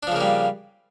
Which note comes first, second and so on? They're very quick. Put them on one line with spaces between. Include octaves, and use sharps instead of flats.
D4 F3 C#3 A#3 G3